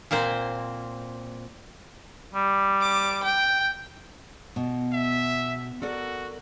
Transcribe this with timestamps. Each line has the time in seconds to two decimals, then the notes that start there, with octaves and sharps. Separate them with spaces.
0.11 A#2 A#3 C4 C5
2.35 G3
2.81 D6
3.24 G5
4.56 B2
4.93 E5
5.82 F#4 A4 A#4 D5